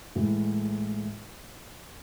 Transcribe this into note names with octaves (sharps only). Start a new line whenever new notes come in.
A2 E3 G#3